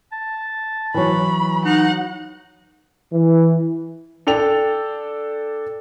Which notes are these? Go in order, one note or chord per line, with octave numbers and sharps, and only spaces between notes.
A5
E3 F#3 B5
D#4 F#5
E3
D4 A4 G5 F7